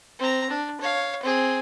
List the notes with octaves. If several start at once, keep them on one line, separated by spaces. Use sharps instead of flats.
C4 A#5
D4
C#5 F5
C4 G#4